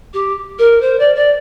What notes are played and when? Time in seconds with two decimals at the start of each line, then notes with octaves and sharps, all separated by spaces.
0.13 G4
0.59 A#4
0.81 C5
0.99 D5
1.15 D5